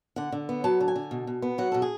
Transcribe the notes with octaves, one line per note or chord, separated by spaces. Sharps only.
D3 F#5
D3
B3
F#3 A5
D3
G#5
D3
B2
B2
B3
F#3 F#5
B2 A4
G#4